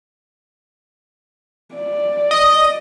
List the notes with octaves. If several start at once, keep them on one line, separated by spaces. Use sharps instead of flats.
D5
D#5